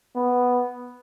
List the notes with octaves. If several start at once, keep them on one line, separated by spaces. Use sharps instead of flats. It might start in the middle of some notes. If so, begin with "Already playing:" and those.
B3